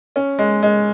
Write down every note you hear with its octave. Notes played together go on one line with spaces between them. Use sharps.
C#4
G#3
G#3